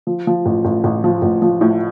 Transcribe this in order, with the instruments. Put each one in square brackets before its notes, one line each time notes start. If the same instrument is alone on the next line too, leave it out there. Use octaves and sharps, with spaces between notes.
[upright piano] F3
F3
A1
A1
A1
F3
A1
F3
A2